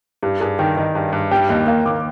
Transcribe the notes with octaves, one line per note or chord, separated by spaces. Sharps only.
G2 G4
G2 G#4
D#3 G5
D#3 D#5
G2
G2
G3 G5
D#2 D#5
A#3 F5
D#2 D6